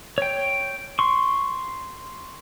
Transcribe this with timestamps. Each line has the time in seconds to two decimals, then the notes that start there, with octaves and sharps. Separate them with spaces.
0.18 C#5 G5
0.99 C6 C#6